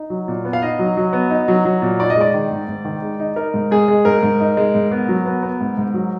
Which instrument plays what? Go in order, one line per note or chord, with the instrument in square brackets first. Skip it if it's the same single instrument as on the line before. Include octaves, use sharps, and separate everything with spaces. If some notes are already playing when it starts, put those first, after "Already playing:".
Already playing: [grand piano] D#4
F#3
A#2
B3
F5
D#4 D#5
F#3
F#3
B3
D#4
F#3
F#3
A#2
D#4 D5
D#5
G#3 D5
D#3
G#2
G#2
D#3
G#3
D#4
D#4 A#4
G#2
G#3 G#4
G#3
G#2 A#4
G#2
D#4
G#3
G#2
B3
F#3
B3
B3
G#2
G#2
F#3